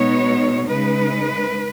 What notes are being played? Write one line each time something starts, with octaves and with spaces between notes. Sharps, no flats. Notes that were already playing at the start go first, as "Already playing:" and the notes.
Already playing: B2 G#3 B3 D#4 C#5
C#3 G#3 D#4 B4